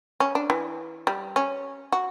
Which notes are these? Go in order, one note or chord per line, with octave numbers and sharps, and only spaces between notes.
C#4
D4
E3
G3
C#4
F#4